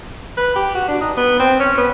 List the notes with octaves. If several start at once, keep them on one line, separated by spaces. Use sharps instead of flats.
B4
G4
F#4
D4
D#4
B3
C4
C#4
B3